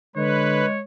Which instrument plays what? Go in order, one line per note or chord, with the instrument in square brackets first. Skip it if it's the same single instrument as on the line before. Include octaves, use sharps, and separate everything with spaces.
[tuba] D3 [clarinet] G#3 [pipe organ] B4 [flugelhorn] C#5